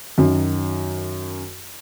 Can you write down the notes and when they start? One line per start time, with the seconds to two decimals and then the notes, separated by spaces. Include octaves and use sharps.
0.18 F#2 D#3